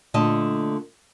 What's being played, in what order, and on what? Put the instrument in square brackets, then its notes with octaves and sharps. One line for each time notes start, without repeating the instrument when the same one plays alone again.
[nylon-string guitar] A#2 D3 A3 D#5 A5